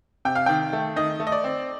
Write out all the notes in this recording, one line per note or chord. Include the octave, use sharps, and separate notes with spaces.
C3 G5
F5
D#3 G5
A3
D#3 D#5
A3
D#5
D5
C4